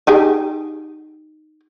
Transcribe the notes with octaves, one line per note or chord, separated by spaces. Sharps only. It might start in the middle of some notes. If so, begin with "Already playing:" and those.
D#4 G4 G#4